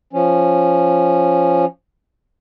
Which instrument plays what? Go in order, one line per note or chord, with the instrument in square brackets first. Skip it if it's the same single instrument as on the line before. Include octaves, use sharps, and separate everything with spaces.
[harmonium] F3 C#4